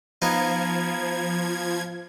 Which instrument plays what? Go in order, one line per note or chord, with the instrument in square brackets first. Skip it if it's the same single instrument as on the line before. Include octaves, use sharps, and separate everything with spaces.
[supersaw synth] F3 G#6 [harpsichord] B3 D#4 F4